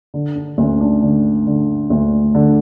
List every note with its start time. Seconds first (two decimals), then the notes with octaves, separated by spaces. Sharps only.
0.14 D3
0.35 D4
0.58 D2 C#4
0.80 D4
1.02 D3
1.47 D3
1.90 D2
2.35 D3